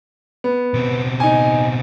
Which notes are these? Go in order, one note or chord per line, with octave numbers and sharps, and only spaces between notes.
B3
B2 C4
D#4 G#5